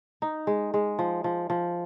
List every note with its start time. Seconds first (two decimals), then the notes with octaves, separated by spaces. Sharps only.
0.22 D#4
0.47 G#3
0.74 G#3
0.99 F3
1.24 F3
1.50 F3